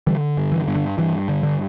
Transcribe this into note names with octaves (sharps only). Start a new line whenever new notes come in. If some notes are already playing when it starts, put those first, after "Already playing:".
D3 E3 G3
G2
E3
G2
D3
G2 E3
D3
D3